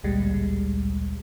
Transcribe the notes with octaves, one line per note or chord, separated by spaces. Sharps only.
A1 D2 A#2 G3 G#3